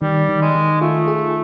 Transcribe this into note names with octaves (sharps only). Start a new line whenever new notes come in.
D#3 G3
D#3
G#3
D#3
A3 F4
G#4